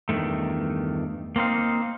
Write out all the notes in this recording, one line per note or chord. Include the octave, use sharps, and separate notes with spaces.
E2 G2 D#3 A3
A#3 C4 D#4 F5